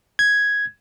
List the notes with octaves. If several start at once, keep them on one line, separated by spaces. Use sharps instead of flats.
G#6